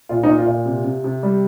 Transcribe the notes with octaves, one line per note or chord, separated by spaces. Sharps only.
A#2 F4
D#4
A#2
F4
A#2
C3
C3
C3
G3